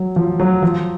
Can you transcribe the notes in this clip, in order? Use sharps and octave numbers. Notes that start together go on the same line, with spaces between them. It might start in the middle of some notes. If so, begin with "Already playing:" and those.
Already playing: F#3
F3
F#3
F3